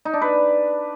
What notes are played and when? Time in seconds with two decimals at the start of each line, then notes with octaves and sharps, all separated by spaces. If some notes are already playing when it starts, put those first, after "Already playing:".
0.05 D#4
0.13 D4
0.22 B4